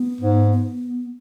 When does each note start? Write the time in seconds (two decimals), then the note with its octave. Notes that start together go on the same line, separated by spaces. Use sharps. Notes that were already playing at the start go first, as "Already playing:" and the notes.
Already playing: B3
0.21 G#2
0.52 B3